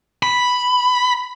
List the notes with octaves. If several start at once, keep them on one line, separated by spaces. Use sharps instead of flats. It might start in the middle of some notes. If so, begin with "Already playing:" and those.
B5